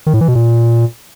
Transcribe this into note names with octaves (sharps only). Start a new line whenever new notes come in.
D#3
A2
E3
B2
A#2